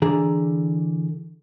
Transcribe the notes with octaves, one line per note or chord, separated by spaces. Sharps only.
D3 E3 G#4 A#5